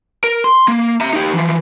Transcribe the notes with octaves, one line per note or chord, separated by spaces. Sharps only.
A#4
C6
A#3
E5 A#5
D#4 G4
E3 F3